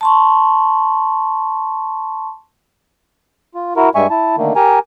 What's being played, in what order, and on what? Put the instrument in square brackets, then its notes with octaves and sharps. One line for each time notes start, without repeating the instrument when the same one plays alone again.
[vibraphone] A5 C6 C#6
[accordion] F4
E4 F#4 A#4
G2 G3 G#3 E5 G#5 C#6
E4 A5
D3 D#3 A3 A#3
G4 A#4 G#5 A#5